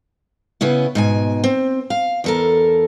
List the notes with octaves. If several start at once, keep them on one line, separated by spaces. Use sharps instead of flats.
C#3 B3 C#4 E4
G#2 B2 G#5
C4
F5
E2 A4 A#4